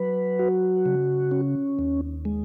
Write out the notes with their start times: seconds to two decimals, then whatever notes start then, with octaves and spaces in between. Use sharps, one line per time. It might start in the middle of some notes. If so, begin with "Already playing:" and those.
Already playing: F#3 B4
0.39 F#4
0.86 C#3
1.31 C#4
1.79 D#2
2.25 G#3